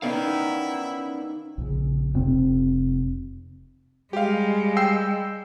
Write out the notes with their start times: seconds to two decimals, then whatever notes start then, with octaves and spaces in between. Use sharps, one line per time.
0.02 D#3 B3 C#4 D#4 E4 D5 F5
1.58 A#1 C#3
2.14 F1 C3 C4
4.13 G3 G#3 G4 F5
4.77 G5 E6 C7